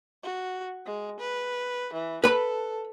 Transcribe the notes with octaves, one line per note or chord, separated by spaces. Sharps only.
F#4
G#3
B4
E3
A4 B4 B5